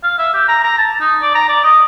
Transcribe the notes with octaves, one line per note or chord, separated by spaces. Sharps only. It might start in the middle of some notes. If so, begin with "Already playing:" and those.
F5
E5
G4
A#5
A#5
A5
D#4
D5
A#5
D5
D#5